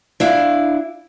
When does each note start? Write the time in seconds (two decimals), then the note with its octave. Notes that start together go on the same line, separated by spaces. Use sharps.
0.20 D4 E4 F5